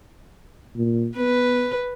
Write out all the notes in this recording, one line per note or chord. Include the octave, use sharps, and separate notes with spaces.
A#2
B3 B4